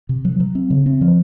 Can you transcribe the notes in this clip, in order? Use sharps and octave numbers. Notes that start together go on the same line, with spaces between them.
C3
F#3
F#3
C4
C#3
C4
F3